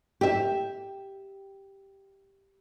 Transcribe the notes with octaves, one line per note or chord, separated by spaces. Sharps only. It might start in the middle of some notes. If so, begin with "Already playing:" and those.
G4 E5